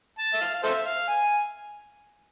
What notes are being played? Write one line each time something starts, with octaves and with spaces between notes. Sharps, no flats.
A5
E5
F5
F5
A4 C5 E5
F5
G#5